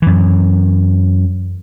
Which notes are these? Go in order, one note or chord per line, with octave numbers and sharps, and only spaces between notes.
F#2 E3